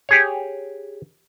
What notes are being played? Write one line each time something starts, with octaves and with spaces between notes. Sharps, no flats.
G4 G#4 C#5